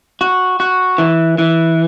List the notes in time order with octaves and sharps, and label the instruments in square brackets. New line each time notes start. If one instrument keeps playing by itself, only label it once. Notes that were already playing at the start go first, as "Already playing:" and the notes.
[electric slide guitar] F#4
F#4
E3
E3